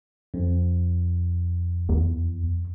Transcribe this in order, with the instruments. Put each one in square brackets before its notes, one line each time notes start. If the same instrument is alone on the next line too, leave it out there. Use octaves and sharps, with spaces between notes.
[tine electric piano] F2
[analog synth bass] E2